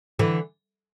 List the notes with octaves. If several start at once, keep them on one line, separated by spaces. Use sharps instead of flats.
D3 E3